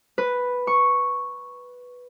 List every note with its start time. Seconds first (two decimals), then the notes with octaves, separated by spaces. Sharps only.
0.18 B4
0.67 C#6